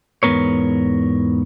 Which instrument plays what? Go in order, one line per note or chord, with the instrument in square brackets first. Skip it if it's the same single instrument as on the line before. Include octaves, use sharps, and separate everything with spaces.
[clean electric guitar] E2 G#2 B2 B3 A#4 C#5